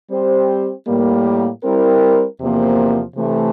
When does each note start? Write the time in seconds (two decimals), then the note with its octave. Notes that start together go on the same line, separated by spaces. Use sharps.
0.11 G3 C4 G4 C5
0.87 A2 G3 A#3
1.64 G3 C4 E4 A#4
2.40 E2 C3 F3 A#3
3.17 C3 E3 A3